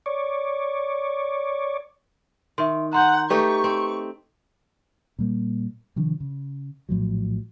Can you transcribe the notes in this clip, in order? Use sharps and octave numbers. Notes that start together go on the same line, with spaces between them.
C#5 D5
D#3 E5 C6
F#5 A#5 C6 G6
A3 D#4 G4 B4 C#6
C4
A#2 G3 A#3
C3 D#3 F3 D4
C#3
A#1 A2 F3 F#3